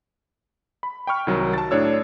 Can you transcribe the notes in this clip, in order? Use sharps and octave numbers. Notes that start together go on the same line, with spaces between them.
B5
G5 B5 C#6 F6
C2 D#3 F#3
A5 A6
A2 D4 C#5 E6